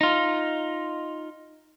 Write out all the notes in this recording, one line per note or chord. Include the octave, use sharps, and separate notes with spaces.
D#4 F4